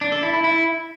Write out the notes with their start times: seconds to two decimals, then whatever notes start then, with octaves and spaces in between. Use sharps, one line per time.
0.01 D4
0.12 A4
0.23 E4
0.33 E4
0.44 E4